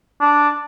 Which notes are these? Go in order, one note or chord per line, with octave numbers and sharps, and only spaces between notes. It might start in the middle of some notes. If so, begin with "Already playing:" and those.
D4